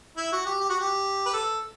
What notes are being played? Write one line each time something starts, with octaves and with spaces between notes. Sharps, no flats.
E4
F#4
G4
G4
F#4
G4
B4
A4